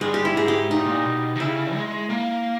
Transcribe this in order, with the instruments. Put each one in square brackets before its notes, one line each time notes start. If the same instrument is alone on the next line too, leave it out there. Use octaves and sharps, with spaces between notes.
[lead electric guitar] G2 [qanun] G#3
[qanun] G4
E4
[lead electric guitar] G#2 [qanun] G#4
[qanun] G4
[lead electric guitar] A#2 [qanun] D#4
[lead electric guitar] G#2
A#2
B2
D#3
[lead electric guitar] C#3 [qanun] E4
[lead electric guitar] G#3
A#3